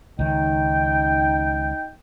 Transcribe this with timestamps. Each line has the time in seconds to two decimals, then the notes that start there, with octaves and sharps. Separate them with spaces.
0.19 C#2 D#3 D#4 G5